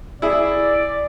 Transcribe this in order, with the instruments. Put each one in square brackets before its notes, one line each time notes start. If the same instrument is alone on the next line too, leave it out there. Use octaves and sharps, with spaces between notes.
[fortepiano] E4 G#4 [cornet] D5